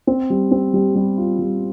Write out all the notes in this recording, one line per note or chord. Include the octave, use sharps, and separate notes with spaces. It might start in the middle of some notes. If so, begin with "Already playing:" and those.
C4
G3
C4
G3
G3
F4
G3